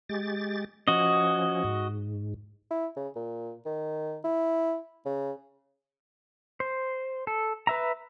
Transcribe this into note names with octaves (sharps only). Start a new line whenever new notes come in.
G#3 G4 A6
F3 C#4 F#4 D#5
G#2
E4
C#3
A#2
D#3
E4
C#3
C5
A4
B4 E5 A#5